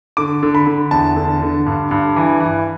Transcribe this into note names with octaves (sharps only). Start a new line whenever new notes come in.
D3 D6
D3
B5
D3
E2 A5
D3
D3
G2
G2
E3
E3